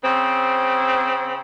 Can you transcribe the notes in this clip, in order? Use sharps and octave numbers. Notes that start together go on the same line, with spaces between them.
C#3 C4